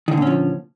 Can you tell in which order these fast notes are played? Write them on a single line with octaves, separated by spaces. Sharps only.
D#3 D3 A#2 C#4 F3